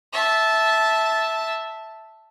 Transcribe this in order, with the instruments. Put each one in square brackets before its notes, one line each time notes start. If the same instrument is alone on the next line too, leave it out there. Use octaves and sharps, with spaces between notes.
[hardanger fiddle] E5 A5